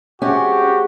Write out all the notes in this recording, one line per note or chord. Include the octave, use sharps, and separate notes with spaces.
C3 G#3 C#4 F#4 G4